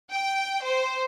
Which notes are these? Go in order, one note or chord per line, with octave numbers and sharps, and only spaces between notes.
G5
C5